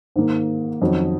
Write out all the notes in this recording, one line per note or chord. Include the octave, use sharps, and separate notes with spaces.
G#2 D#3 A#3
F2 D#3 F#3 C#4